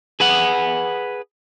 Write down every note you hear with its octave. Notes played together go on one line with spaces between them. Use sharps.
G#4 B4 F#5